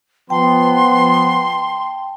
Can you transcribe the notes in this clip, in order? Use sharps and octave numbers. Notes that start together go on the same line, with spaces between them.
F3 B3 G5 A5 C6